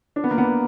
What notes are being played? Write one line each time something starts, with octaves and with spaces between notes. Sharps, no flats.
D4
B3
A#3
B3